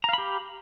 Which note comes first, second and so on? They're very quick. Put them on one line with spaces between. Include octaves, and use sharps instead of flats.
A#5 F5 B5 G4